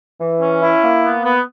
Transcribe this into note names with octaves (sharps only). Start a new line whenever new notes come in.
E3
C#4
E4
A#3
B3
B3